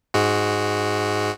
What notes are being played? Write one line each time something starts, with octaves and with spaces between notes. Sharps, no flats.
G#2 G#3 F#4